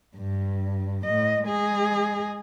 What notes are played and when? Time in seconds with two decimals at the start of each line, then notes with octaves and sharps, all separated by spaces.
0.17 G2
1.05 A2 D#5
1.43 G#3 G#4